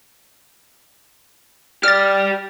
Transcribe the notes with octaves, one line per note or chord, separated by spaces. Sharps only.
G4 D5 F6 A6